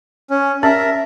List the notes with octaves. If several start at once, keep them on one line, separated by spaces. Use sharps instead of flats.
C#4
C#4 A#4 E5